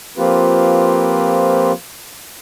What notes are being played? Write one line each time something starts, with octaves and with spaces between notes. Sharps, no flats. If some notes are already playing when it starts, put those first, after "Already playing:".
F3 A#3 C4 F4 G4 B4